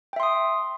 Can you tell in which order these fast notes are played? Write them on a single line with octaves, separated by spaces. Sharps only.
G5 E5 C6 D#6